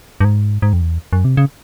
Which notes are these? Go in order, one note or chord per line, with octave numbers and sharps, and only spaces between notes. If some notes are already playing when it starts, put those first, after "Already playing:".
G2
G#2
G#2
F2
E2
F#2
C3
C#3